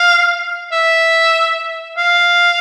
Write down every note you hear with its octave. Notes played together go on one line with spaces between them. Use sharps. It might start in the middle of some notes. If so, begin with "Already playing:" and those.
Already playing: F5
E5
F5